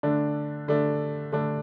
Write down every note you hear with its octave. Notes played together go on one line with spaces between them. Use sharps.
D3 A3 D4
D3 A3 D4
D3 A3 D4